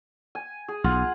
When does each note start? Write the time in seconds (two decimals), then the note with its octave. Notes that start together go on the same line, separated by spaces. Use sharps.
0.35 G#5
0.68 G#4
0.84 B1 F4 F#5